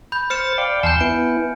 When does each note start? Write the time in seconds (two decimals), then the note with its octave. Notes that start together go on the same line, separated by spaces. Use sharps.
0.12 B5 G6
0.30 C5 F6 A6 C#7 E7
0.58 D5 F5 G5
0.83 E2 G#5 A5 C6 E6 G6
1.00 B3 E4 D7